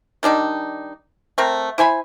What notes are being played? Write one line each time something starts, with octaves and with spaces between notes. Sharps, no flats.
D#3 G3 D4 D#4
A3 C4 A#4
E4 C5 G#5 B5